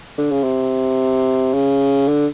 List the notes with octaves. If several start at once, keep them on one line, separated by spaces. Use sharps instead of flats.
D3
C#3
C3
C#3
D3